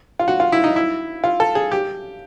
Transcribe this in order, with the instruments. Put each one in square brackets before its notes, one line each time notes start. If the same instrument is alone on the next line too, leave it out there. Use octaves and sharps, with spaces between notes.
[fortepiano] F4
F#4
F4
E4
D#4
E4
F4
A4
G#4
G4